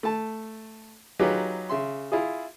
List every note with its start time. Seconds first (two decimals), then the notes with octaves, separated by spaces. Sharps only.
0.03 A3 A5
1.19 F#3 D#4 F4 G4 G#4 B4
1.69 C#3 E5 C6
2.12 E4 F4 G#4